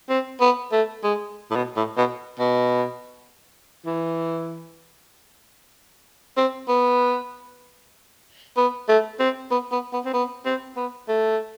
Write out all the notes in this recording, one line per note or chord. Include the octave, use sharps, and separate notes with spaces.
C4
B3
A3
G#3
A2
B2
A2
B2
B2
E3
C4
B3
B3
A3
C4
B3
B3
B3
C4
B3
C4
B3
A3